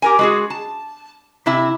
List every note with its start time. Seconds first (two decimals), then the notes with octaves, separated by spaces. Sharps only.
0.02 G4 A#4 G#5
0.19 G#3 F#4 G#4
0.50 A5
1.46 C3 E4 E5